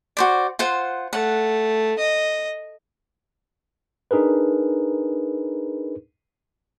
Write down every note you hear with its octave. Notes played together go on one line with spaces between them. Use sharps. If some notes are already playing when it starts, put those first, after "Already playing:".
F#4 C5 D5
F4 C5 F#5
A3 F#5
D#5
D4 D#4 G#4 A#4 B4